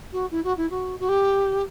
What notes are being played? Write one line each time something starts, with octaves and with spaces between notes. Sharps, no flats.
F#4
E4
F#4
E4
F#4
F#4
G4